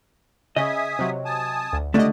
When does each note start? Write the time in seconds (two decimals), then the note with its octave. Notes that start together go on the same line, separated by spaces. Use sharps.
0.56 C#3 D#5 E5 G#5 D#6
0.99 C3 F#3
1.25 G#5 A5 D#6
1.73 D2
1.94 C#2 D3 G3 A3 D5 D#5